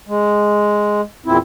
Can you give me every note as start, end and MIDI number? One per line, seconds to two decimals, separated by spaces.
0.08 1.01 56
1.26 1.37 40
1.26 1.37 46
1.26 1.37 60
1.26 1.37 64